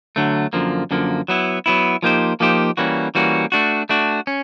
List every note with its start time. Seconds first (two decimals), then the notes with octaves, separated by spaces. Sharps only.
0.16 D3 F#3 A3
0.53 F#2 D3 F3 A#3
0.91 F#2 D3 F3 A#3
1.28 F#3 B3 E4
1.66 F#3 B3 E4
2.03 F3 A#3 D#4 G4 C5
2.40 F3 A#3 D#4 G4 C5
2.77 E3 G3 A#3 C#4 F#4
3.15 E3 G3 A#3 C#4 F#4
3.52 A3 D4 F#4
3.89 A3 D4 F#4
4.27 C#4